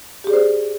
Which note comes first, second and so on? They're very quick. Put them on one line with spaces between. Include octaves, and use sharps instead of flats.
G4 G#4 D5 C5